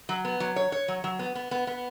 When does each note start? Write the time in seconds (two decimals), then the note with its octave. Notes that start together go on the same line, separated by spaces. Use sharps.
0.09 F#3
0.25 B3
0.40 F#3
0.56 C#5
0.72 C#5
0.88 F#3
1.04 F#3
1.19 B3
1.35 B3
1.51 B3
1.67 B3